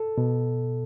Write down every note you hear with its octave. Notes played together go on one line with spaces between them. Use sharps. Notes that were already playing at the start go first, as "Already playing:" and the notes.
Already playing: A4
B2